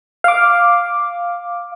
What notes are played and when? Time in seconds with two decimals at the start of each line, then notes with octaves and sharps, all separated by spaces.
0.24 F5 D6